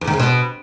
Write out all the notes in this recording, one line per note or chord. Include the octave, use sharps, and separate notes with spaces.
E2
D#3
C#3
B2